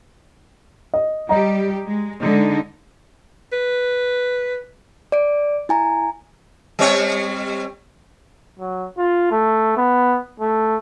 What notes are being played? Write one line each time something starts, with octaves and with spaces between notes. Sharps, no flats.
D#5
G3 G4 D#5 A#5
G#3
D3 G#3 D#4
B4
D5 D7
E4 G#5 A#5
G3 C4 C#5
F#3
F4
A3
B3
A3